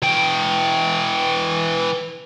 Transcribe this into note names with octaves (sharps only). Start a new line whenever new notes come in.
E3 G5